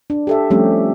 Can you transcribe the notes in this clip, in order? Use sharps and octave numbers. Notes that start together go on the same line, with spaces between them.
D4
G4 A4 E5
F3 G3 A3 C4 C#4 G4